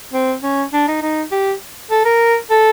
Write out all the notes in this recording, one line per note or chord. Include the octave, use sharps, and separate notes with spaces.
C4
C#4
D4
D#4
D#4
G4
A4
A#4
A4